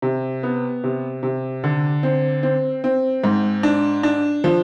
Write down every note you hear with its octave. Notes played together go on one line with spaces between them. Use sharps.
C3
B3
C3
C3
D3
C4
C4
C4
G#2
D4
D4
F3